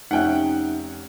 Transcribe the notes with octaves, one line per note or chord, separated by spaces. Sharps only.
F1 C#4 D#4 E5 F#5 G5 F#6